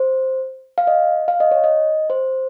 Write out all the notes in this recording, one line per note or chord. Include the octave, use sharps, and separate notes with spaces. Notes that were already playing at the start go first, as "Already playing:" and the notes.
Already playing: C5
F5
D#5
F5
D#5
C#5
D#5
C5